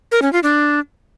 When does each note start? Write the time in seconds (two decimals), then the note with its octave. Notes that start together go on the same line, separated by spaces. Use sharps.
0.12 A#4
0.22 C#4
0.33 F4
0.43 D4